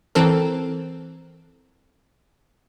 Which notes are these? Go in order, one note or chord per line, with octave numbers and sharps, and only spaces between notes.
E3 C4 A4 A#4